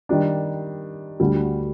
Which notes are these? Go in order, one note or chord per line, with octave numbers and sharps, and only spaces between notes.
D#3 G3 D4
D2 D3 G3